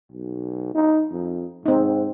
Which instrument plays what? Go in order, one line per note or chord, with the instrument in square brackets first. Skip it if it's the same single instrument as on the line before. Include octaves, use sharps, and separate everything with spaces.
[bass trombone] B1
D#4
F2
[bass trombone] G#2 [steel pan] C4 D#4